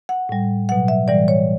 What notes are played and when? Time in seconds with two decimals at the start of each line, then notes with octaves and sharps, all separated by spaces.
0.09 F#5
0.29 A2 G3
0.69 B2 F#3 F#5
0.88 E5
1.08 A2 E3 G3 D5
1.28 C#5